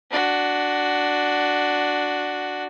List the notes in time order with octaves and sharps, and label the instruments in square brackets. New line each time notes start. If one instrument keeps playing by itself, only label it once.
[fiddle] D4 F#4